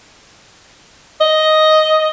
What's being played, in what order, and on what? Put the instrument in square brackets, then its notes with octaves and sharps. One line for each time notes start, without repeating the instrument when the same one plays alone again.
[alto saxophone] D#5